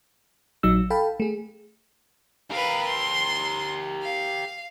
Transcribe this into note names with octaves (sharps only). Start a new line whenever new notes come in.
A#1 F#3 D#4 E6
A4 F5 G5 A5 B5
A3 G#4
G4 A#4 B4 F5
C6
F5